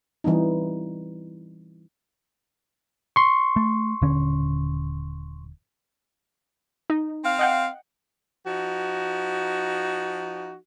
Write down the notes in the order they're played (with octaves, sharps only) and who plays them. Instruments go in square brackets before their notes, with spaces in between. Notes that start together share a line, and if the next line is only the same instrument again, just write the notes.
[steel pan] E3 G3 C4 D#4
[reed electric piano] C6 C#6
[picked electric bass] A3
D#1 D3 C#4
[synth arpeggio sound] D#4
[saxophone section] C4 F5
[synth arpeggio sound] D#5 F#5 G5
[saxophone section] F3 D#4 F#4